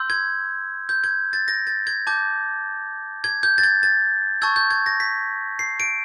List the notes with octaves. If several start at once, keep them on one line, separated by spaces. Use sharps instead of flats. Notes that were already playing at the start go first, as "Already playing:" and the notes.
Already playing: C6 E6 G6
G#6
G6
G#6
A6
A#6
A6
G#6
A5 D6 G6
G#6
G6
A6
G#6
A6
A5 C#6 E6 G6 G#6
G6
G#6
A#6
B6
C7
D7